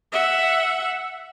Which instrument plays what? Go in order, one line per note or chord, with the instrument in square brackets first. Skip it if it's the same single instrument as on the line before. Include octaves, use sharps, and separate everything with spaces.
[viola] E5 F#5